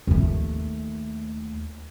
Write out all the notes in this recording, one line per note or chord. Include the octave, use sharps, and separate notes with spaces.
D#2 A3